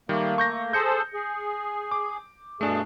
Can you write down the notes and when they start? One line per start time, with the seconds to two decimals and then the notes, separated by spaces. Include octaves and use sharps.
0.09 D#3 G3 A3 A#3
0.38 C#6 G6 A#6
0.73 G#4 A4 C5 G6 C#7
1.14 G#4
1.91 D6
2.61 G2 B2 A3 D4 G#4 A5